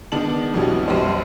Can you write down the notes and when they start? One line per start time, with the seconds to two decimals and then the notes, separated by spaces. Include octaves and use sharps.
0.12 D#3 G#3 B3 D4 A5 F#7
0.54 B1 F2 B2 E3 F#3 G3
0.88 B1 F#2 G3 C5